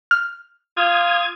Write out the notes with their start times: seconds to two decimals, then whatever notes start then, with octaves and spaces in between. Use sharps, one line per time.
0.11 F6
0.77 F4 D#6 G#6